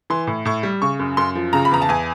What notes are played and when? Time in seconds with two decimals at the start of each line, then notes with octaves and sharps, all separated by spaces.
0.10 E3 C6
0.27 A2
0.45 A2 C#6
0.63 G3
0.82 C#3 C#6
0.99 F#2
1.17 F#2 C6
1.35 F3
1.53 C#3 A#5
1.65 B5
1.71 E2 A#5
1.82 A5
1.89 E2 G#5